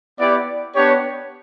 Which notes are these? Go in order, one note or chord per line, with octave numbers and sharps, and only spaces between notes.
B3 E4 G4 D5
B3 D4 G4 C#5